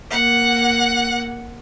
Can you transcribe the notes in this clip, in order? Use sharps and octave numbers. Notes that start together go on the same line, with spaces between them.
A#3 F#5